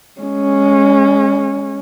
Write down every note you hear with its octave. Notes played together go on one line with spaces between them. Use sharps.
G#3 C#4